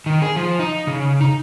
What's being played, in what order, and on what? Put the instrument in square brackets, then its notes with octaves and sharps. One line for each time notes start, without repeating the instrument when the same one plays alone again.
[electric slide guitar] D#3
G#4
F3
D#4
C#3
D#4